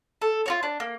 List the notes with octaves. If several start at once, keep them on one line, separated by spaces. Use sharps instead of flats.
A4
F4 F#4 C#5
D4
A#3